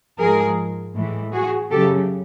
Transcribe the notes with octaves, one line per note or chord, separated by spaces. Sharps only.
G#2 F3 G#3 G#4 A#4
A2 E3 G#3
F#4 G#4
F#2 C#3 F#3 G4 A4